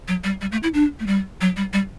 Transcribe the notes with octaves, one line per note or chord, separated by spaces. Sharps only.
F#3
G3
G3
A3
E4
D4
A3
G3
F#3
G3
G3